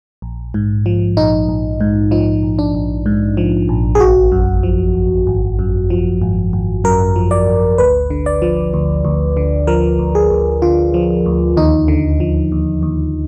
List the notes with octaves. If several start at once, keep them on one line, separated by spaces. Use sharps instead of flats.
A#1
G#2
F3
A#1 D#4
A#1
G#2
F3 D#4
A#1
D4
A#1
G#2
F3
A#1
G#4
G#1 F#4
F#2
F3
G#1
G#1
F#2
F3
G#1
G#1
F#2 A#4
F3
D5
G#1
D2 B4
D3
D5
F3
D2
D2
D3
F3 A#4
D2
G#4
D2
D3 F4
F3
D2
D#2 D#4
D3
F3
D#2
D#2